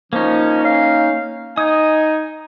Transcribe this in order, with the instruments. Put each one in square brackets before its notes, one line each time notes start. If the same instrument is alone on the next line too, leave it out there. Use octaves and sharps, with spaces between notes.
[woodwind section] F3 C#4 [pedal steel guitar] A#3 D#4
[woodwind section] C#4 F5
[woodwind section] D#4 G#5 [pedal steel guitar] D#6